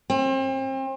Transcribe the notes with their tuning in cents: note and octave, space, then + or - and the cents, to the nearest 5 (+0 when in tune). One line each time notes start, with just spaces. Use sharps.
C4 +35